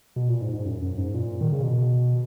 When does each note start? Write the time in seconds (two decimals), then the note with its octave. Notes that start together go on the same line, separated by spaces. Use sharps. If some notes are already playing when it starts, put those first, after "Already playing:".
0.16 B2
0.28 A#2
0.42 G#2
0.54 G#2
0.65 F#2
0.82 F#2
0.98 G#2
1.14 A#2
1.41 D#3
1.52 C#3
1.63 B2